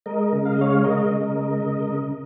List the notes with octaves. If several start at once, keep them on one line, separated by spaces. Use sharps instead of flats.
G#3 A#4 D#5
C#3
F5
D#5
G#3 C#5 F5
G#3 A#4 D#5
C#3
G#3
C#3
C#3